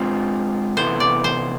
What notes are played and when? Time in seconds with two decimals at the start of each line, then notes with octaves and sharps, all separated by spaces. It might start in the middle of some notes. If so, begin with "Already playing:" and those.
Already playing: G#3 C4 F4
0.77 C3 E3 B3 E4 A4 C5
1.00 D5
1.24 C5